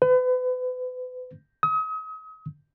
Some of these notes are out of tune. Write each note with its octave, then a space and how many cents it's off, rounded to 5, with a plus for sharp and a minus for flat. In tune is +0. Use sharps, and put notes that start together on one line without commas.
B4 +35
D#6 +40